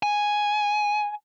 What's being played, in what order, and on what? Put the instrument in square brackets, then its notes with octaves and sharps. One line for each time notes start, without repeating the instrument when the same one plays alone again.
[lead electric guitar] G#5